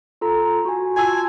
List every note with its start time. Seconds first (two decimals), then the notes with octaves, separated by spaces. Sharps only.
0.21 F4 A4 A#5
0.65 F#4 G#5
0.97 F4 G#5 A5 E6